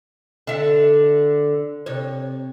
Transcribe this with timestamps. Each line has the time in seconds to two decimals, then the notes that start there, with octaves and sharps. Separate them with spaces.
0.47 D3 E5
1.86 C3 C#5